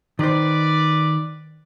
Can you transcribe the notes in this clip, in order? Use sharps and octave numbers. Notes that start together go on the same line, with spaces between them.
D#3 B4 C5 D5